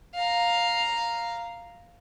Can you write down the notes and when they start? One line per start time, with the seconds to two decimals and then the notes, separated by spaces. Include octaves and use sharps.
0.14 F5 A#5